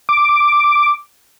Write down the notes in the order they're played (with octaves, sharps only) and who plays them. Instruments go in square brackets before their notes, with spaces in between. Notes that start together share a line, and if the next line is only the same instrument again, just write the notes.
[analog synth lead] D6